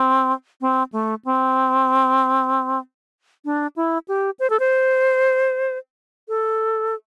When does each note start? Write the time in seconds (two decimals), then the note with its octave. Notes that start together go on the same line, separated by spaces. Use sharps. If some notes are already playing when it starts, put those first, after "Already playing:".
Already playing: C4
0.61 C4
0.93 A3
1.25 C4
3.45 D4
3.76 E4
4.08 G4
4.39 C5
4.50 A4
4.60 C5
6.28 A4